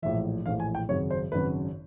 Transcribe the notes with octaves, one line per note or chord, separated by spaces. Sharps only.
A#1 A2 E3 E5
A#1 A2 E3 F5
G#5
G5
G#1 F#2 C#3 C#5
C5
G#1 F#2 C#3 B4